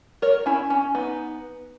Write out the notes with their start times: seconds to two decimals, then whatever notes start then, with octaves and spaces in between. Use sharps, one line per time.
0.22 A#4 C#5
0.46 C#4 E4
0.70 C#4
0.95 B3 D#4